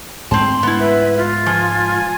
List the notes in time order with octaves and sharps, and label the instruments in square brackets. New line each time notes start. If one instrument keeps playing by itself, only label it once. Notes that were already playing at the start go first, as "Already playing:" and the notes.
[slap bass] G#2 G#3 A3 [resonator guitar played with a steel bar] C4 A5 [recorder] C6
[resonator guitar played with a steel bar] B3 E4
[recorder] B4 [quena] E5
[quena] F4
[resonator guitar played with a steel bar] F3 [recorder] G#5